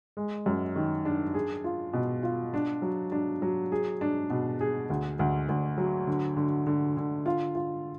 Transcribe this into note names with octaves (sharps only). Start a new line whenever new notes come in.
G#3
F#2
D#3
D4
G#4
F4
B2
F4
D4
F#3
D4
F#3
G#4
D4
B2
G#4
D2
D2
D2
F#3
D3
D3
D3
D3
F4
F4